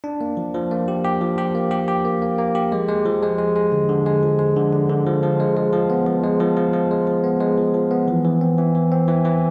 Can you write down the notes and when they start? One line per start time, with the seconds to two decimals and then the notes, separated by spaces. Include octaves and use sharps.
0.04 D4
0.21 A#3
0.37 F3
0.54 F3
0.71 A#3
0.88 G4
1.04 G4
1.21 F3
1.38 G4
1.55 A#3
1.71 G4
1.88 G4
2.05 A#3
2.22 A#3
2.38 A#3
2.55 G4
2.72 G#3
2.89 G#3
3.06 F3
3.23 G#3
3.38 G#3
3.56 G#3
3.72 D3
3.89 D3
4.06 G#3
4.23 F3
4.39 G#3
4.56 D3
4.73 D3
4.89 D3
5.06 F3
5.23 F3
5.40 G#3
5.57 G#3
5.73 F3
5.90 B3
6.06 F3
6.24 G#3
6.40 F3
6.57 F3
6.73 F3
6.91 G#3
7.07 F3
7.24 B3
7.40 G#3
7.58 F3
7.74 F3
7.91 B3
8.08 E3
8.25 E3
8.41 C4
8.58 E3
8.75 E3
8.92 C4
9.08 E3
9.25 E3